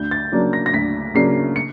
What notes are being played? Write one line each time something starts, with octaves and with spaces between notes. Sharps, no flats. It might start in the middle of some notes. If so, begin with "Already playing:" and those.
Already playing: D2 G6
A6
C#3 F#3 A#3 D4
A#6
A#6
D2 B6
C#3 F#3 A#3 D4 C7
C#7